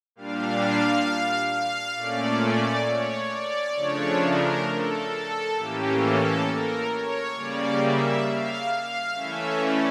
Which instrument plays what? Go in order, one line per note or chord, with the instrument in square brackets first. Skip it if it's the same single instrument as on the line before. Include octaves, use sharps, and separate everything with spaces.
[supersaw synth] A#2 G3 D4 F5
F5
A#2 A3 C#4 D5
D5
C#5
D5
C#3 F3 A3 D4 C#5
A#4
A4
A4
A2 E3 A#3 C#4 G4
A4
A#4
C#5
C#3 G3 A#3 D5
E5
F5
F5
E3 A3 C#4 E5
D5